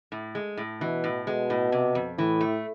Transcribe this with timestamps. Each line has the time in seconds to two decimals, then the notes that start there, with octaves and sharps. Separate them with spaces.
0.12 A2
0.35 G#3
0.57 A2
0.81 B2 E3
1.04 A2
1.27 B2 G#3
1.50 A2
1.72 C3
1.95 F2
2.18 A2 E3
2.41 A3